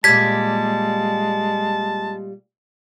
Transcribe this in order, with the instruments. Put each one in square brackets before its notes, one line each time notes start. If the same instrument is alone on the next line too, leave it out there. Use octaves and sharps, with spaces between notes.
[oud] A#2 G3 [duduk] G#3 [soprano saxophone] A5 [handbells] G#6 B6